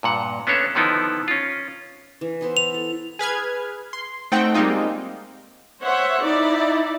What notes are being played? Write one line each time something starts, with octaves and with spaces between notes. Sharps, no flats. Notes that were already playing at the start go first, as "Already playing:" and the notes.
G2 A#2 F#5
B3 C#4 D4 A4 C#5 E5
D3 D#3 F3 B3 D#4 E4
C#4 F4
E3
B3 E4 C5
F7
A4
G#4 B4 F6 G#6
C6
A3 C4 D#4 F#5 G5
G3 G#3 A#3 C4 D#4 F4
C5 C#5 E5 F#5
D#4 E4 D5